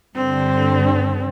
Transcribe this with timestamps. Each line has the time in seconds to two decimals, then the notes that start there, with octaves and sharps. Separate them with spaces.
0.16 G2 D3 C4